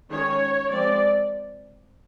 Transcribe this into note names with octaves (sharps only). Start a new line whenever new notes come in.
D#3 G#3 C#4 C#5
F3 G#3 C4 D5